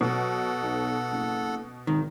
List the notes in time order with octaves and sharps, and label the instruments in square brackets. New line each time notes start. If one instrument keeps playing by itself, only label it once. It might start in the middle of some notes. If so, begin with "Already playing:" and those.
[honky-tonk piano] B2 [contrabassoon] F#3 [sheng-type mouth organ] A4 F#5
[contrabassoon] B1
F#1
[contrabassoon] G#1 [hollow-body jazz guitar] D#3